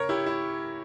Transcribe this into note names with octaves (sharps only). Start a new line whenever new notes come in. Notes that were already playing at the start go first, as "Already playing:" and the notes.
Already playing: C#3 A#4 C#5
E4 G4
E4